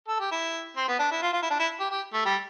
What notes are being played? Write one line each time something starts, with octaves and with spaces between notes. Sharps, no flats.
A4
G4
E4
C4
B3
D4
E4
F4
F4
E4
D4
E4
G4
G4
A3
G3